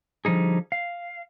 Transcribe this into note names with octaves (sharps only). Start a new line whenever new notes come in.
D3 F3 G3 D#4 G#4
F5